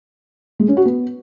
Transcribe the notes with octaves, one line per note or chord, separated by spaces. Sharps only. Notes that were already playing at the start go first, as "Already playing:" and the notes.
G#3
C#4
F#4
B3